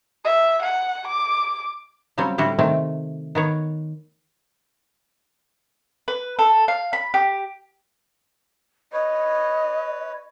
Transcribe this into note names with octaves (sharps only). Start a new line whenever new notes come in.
E5
F#5
D6
C#3 F#3 G3 C4
A2 D3 G3 E4 F#4
C3 D#3 A3 C4
D#3 B3 C#5
B4
A4
F5
B5
G4
B4 C#5 D#5